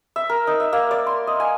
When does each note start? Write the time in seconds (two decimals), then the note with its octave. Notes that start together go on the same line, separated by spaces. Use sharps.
0.16 E5
0.29 A#4
0.47 D#4
0.60 E5
0.73 A#3
0.91 D5
1.07 C6
1.27 D#5
1.40 G#5